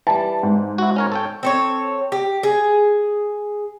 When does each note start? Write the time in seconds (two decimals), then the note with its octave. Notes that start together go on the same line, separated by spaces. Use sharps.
0.07 E3 G3 A5
0.43 G#2
0.78 E4 F#4
0.96 C#4 A#4 C#5
1.12 A4 C#5 G5
1.43 C4 A4 C#5
2.12 G4
2.43 G#4